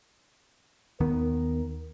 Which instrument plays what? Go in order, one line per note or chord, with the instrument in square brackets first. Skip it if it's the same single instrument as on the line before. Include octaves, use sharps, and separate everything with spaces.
[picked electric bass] D#2 D#3 B3 [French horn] A#4